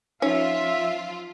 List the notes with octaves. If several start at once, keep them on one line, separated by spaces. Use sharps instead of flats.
F3 C#4 D#4 F4 E5